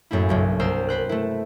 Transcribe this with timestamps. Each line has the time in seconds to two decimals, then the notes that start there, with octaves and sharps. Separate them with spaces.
0.11 F#2 A2 A#3 E4
0.29 F#1 B1 G2
0.60 C2 A#4 C5 E6
0.89 B4 C5 F#6
1.09 A3 E4